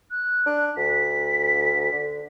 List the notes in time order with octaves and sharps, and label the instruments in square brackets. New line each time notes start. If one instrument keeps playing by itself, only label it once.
[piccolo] F#6
[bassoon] D4
[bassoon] D2 [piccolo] B6
[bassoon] D3